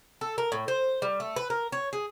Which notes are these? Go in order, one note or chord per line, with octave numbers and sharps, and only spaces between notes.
A4
A#4
A2
C5
G3
A3
B4
A#4
C#5
G#4